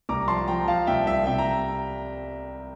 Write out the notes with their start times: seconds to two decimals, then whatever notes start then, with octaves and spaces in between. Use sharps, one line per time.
0.09 C2 A#5 D6
0.28 F3 A5 C6
0.48 F3 G5 A#5
0.67 F3 F5 A5
0.87 C2 E5 G5
1.07 C2 E5
1.26 C3 E5 G5
1.38 A#5